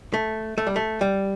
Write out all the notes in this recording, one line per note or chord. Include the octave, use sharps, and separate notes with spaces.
A3
A3
G3
A3
G3